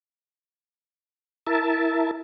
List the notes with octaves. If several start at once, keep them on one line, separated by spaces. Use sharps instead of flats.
E4 A#4 E5 A5